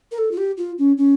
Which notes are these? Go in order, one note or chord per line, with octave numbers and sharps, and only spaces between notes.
A#4
A4
F4
G4
F4
C#4
C#4